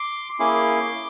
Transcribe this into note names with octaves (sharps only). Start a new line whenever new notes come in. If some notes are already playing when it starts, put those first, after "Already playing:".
Already playing: C6 D6
A#3 C#4 E4 G#4 C6 D6